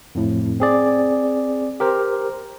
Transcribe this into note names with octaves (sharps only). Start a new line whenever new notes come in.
F2 A2
C4 G#4 D5
G4 A#4 C5